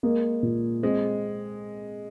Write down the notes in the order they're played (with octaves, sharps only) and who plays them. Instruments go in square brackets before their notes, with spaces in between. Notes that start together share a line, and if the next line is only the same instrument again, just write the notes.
[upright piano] G#3 [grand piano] A#3
[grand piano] A#2
[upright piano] G#3 [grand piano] C4